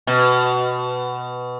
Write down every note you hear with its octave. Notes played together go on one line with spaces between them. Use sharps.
B2